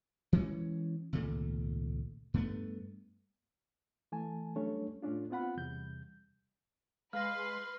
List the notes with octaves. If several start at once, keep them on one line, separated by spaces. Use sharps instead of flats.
E3 G#3 A3 C#4
G#1 C#2 A#2 A3
G2 A3 B3
E3 A3 G#5 A5
F#3 G3 A3 C#4 D4 C#5
A2 A3 C#4 D4 F4
B3 C4 F4 F#5 B5
E2 C3 G3 G6
G#3 B4 F5 C6 F6 A#6